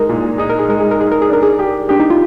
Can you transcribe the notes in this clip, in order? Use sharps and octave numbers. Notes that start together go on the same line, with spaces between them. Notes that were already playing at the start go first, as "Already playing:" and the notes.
Already playing: G#3 D#4 A#4
A#2
D#4 G#4
A#4
G#4
G#3 A#4
G#4
A#4
D#4 G#4
A#4
G#4
D4 A#4
G#4
G4
D4 G4
D#4
F4